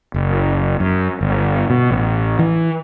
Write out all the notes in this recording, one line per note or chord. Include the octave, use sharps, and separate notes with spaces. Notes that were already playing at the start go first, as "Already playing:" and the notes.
F#1
F#2
G1
B2
A1
E3